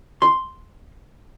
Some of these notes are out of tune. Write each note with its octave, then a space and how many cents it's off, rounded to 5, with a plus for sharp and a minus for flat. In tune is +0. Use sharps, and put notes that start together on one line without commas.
C6 +0